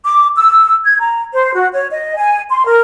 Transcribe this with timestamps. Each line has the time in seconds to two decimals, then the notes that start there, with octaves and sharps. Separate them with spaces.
0.04 D6
0.36 E6
0.85 G#6
0.99 A#5
1.33 C5
1.54 F#4
1.74 C#5
1.91 D#5
2.16 G#5
2.50 C6
2.65 A#4